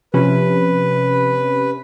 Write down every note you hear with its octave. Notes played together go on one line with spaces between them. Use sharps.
C3 F3 C#4 B4